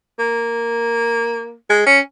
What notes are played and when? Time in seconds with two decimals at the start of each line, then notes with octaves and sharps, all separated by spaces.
0.19 A#3
1.70 G#3
1.86 C#4